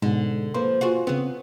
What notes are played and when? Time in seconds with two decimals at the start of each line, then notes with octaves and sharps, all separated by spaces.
0.02 G#2 B2 D3
0.54 F3 A#3 B4 C6
0.81 F4 F#4 G#4
1.07 C#3 B3 C4 G#4